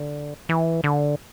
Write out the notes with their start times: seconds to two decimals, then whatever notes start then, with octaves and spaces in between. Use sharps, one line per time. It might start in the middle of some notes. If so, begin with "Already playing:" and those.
Already playing: D3
0.49 E3
0.84 D3